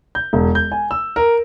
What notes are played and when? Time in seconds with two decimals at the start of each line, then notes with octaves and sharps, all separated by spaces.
0.15 G6
0.33 E1
0.55 G6
0.72 G#5
0.91 E6
1.16 A#4